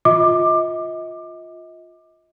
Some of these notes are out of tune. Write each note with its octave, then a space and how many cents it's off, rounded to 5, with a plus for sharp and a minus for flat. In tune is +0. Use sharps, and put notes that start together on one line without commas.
F4 +10 D#5 +35 D6 +20